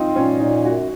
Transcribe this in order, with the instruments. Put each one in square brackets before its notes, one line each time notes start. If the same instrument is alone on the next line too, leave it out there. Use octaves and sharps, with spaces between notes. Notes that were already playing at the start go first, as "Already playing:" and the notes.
Already playing: [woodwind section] C4 [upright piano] D#4 F4
[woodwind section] A#2 [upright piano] C#4
[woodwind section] A#2 [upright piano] D#4
[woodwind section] F#2 [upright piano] F#4